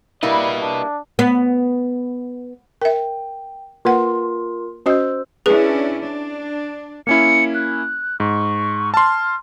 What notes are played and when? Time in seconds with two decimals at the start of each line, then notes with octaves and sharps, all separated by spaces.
0.23 G3 A#3 E4 B4 D5 D#5
0.62 D4
1.19 B3
2.82 A#4 E5 G5
3.85 A#3 F4 A#4 B4 F#5 C6
4.86 C#4 F#4 C5 D#5 E6 G6
5.46 C#4 D4 E4 G#4 B4
6.02 D4
7.07 A#3 C#4 E4 C#7
7.54 F#6
8.20 G#2 C#6
8.94 A5 C6 F6